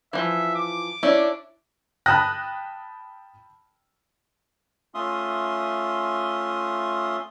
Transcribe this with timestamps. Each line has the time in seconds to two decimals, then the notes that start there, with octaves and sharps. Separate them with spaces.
0.13 E3 F3 E5
0.55 D6
1.03 C#4 D4 E4
2.06 G5 A5 B5 D#6 F#6 A#6
4.94 A3 C#4 F4 E5 C6 D#6